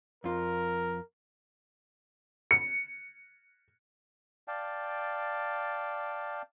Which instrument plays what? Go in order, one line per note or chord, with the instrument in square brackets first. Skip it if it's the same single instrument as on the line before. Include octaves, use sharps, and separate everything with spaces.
[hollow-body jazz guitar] F2 F4 [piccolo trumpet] A#4
[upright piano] C#7
[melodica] D5 F5 G5 A5